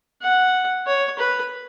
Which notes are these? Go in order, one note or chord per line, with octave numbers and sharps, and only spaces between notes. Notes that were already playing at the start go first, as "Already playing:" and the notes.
F#5
C#5
B4